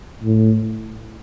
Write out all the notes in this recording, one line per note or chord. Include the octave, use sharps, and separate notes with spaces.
A2